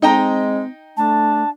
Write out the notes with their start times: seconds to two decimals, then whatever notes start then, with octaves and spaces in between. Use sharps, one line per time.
0.02 G#3 C4 D#4 G5 A#5
0.97 A3 D4 A5